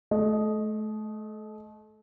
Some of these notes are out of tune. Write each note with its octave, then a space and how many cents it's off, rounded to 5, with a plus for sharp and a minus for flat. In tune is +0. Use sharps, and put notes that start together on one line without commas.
A3 -35 D#5 +0